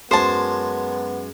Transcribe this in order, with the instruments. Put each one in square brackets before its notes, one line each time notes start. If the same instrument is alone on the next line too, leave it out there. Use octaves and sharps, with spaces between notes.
[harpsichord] F#2 G#3 [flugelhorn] B3 [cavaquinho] C5 A5